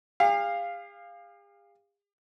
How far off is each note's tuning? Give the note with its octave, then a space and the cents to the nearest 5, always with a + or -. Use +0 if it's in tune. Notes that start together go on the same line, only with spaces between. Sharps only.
G#4 -45 F5 +0